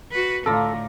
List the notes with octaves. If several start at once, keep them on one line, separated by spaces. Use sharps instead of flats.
F#4 B4
A2 D3 F4 A4 A#5 D6